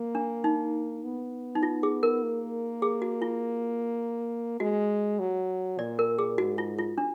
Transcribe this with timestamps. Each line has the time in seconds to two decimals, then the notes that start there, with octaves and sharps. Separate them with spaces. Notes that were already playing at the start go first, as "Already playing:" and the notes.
Already playing: A#3
0.15 D4
0.44 D#4
1.04 B3
1.55 D#4
1.63 F4
1.83 G#4
2.03 A#4
2.23 A#3
2.82 G#4
3.02 F#4
3.22 F4
4.60 G#3 F#4
5.20 F#3
5.79 A#2 D5
5.99 A#4
6.19 G#4
6.38 G#2 F#4
6.58 F4
6.78 F4
6.98 D4